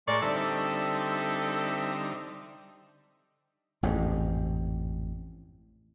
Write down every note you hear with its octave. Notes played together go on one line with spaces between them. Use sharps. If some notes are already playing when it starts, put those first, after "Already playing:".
A2 G#3 A#4 C#5 D5 C6 C#6
D3 G3 C4 D#4 A4 E5
A1 F2 G#2